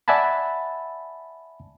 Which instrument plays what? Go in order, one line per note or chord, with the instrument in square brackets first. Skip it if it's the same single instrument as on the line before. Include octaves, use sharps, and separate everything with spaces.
[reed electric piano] D5 E5 F#5 G#5 A5 B5